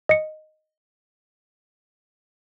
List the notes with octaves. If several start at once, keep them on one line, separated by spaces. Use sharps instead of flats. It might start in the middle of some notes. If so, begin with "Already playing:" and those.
D#5 C#7